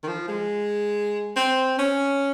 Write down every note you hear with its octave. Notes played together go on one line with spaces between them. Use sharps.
D#3
F3
G#3
C4
C#4